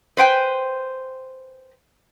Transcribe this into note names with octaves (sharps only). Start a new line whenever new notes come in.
B4 C5 G5 G#5